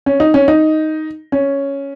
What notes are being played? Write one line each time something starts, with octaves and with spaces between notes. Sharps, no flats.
C#4
D#4
C#4
D#4
C#4